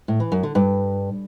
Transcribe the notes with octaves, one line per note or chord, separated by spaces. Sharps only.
A2
E3
F#2
D3
G2